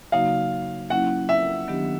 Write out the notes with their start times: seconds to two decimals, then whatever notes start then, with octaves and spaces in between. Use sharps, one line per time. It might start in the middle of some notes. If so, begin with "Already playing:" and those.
0.12 C#3 F#3 A#3 D#4 F#4 F5
0.90 F#3 A#3 C#4 E4 F#5
1.29 E5
1.68 D#3 F#3 B3 D4 G4